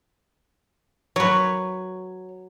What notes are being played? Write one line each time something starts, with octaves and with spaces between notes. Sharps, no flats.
F#3 B4 C#5